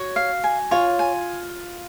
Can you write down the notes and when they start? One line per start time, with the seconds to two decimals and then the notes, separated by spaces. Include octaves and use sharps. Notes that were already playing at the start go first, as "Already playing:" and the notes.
Already playing: F#4 C#5
0.16 F5
0.44 G#5
0.71 F4 C#5
0.99 G#5